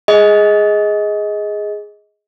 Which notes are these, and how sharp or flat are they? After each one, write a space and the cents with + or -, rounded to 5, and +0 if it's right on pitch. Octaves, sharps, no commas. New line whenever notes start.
G#4 +0 D#5 +20